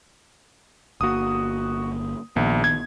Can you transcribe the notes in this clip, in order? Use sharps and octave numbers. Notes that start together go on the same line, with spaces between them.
G1 A#3 F#4 D#6
A#1 D#3 B3
G#6